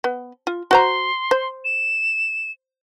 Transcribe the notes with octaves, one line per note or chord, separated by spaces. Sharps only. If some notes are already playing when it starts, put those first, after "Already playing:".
B3
F4
F#4 C5 A#5 C6
C5
E7